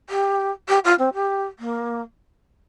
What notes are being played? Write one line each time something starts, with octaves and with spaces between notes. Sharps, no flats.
G4
G4
F4
C4
G4
A#3